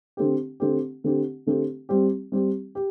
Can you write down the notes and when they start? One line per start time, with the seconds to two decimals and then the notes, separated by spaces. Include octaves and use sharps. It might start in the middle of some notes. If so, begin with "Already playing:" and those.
0.17 D3 A3 C4 G4
0.60 D3 A3 C4 G4
1.04 D3 A3 C4 G4
1.46 D3 A3 C4 G4
1.89 G3 C4 G4
2.32 G3 C4 G4
2.75 G4